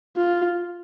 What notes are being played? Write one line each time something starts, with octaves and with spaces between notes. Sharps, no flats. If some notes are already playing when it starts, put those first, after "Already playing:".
F4